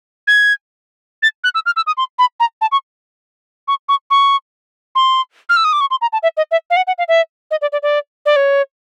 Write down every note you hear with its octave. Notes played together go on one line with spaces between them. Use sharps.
G#6
A6
F#6
E6
F6
E6
D#6
C6
B5
A#5
A5
C#6
C#6
C#6
C#6
C6
F6
E6
D#6
D6
C#6
C6
A#5
A5
E5
D#5
E5
F5
F#5
F#5
F5
E5
D#5
D5
D5
D5
D5
C#5